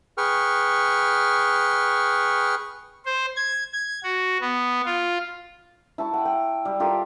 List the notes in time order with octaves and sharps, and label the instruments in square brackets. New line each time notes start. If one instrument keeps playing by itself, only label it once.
[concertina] G#4 B4 G5 C#6 F6
[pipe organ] C5
G#6
G#6
F#4
B3
F4
[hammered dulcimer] E4 A5 C#6
F#5 G5
G5
G3
F4 G4 A4 A#4